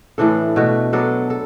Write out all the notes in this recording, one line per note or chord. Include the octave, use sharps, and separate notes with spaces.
A2 E3 D4 A4
B2 A3 F#4
F#3 B3 D4 A4
A4